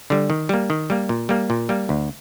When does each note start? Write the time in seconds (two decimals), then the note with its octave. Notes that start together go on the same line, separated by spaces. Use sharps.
0.10 D3 G3
0.30 D#3
0.49 G3 A#3
0.70 D#3
0.90 G3 A#3
1.09 A#2
1.29 G3 A#3
1.50 A#2
1.69 G3 A#3
1.89 D2